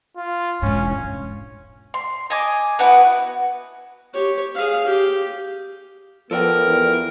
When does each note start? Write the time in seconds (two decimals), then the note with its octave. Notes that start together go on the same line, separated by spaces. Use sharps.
0.17 F4
0.62 E1 G#2 C#4
1.94 C6
2.30 D#5 G#5 D6
2.79 B3 E4 F#4 B4
4.14 G4 C#5
4.55 G#4 F5
4.87 G4
6.31 F3 B3 A4 A#4 D5 G5
6.67 E2